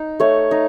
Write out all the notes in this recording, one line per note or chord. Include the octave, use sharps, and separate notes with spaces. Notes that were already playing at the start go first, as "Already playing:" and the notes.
Already playing: D#4
A3 C#5
D#4